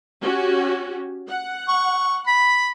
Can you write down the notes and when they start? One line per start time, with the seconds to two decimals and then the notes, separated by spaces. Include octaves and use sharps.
0.21 C#4 F#4 G4
1.28 F#5
1.69 C#6
2.27 B5 B6